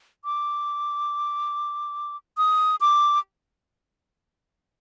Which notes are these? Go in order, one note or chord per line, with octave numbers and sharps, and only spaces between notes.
D6
D#6
D6